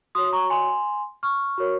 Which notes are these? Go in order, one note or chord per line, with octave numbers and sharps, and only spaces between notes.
F#4 C#5 C6 D#6
A#5 C#6
G#5 C6
C#6 F6
F#4 A#4 C#5